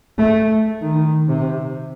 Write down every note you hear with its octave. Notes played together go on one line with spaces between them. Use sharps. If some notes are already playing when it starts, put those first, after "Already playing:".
A3
D#3
C3